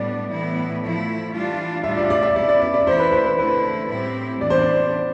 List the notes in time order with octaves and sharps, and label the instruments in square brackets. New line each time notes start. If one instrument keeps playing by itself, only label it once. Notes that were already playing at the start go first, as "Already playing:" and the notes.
Already playing: [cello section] A2 G3 B3 D4 [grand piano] D5
[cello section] A2 E3 B3 E4
F3 A3 E4
E3 G3 D4 F4
[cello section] A2 G3 D4 F4 [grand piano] E5
[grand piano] D5
D5
E5
[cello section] B2 B3 E4 [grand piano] D5
[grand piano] D5
D5
D5
[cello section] E3 A3 E4 [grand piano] C5
[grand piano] B4
C5
B4
[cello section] D3 A3 E4 [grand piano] B4
[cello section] A2 G3 C4 E4
[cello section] A2 E3 B3 D4 [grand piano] D5
[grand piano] C5
D5